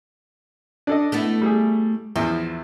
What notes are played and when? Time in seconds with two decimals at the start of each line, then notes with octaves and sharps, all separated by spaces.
0.87 D4 A4 D#5
1.12 A3 B3 E4
1.42 G3 G#4
2.16 E2 F3 E4